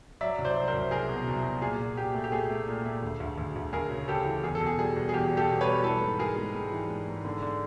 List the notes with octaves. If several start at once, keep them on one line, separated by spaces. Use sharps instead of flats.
F#3 D5 E5
C2
C5 D5
F#3
A#4 C5
C2
C2 G#4 A#4
B2
C2
B2
A#2 G#4
A#2
A#2 G4
A3
G4
A3 G#4
A3
A#2
A3
D2
D2
D2
D2
D2 G#4 A#4
C#3
C#3 G4 A4
E3
E2 G#4
A4
B2
G#4
G3 G#4
B2
G#4
E2 G4
G3
G4 A4
B2
B4 C#5
G3
E3 A4 B4
G#2
G#3 G#4 A#4
G#3
G#2
E3
G#2
G#2
D3
D3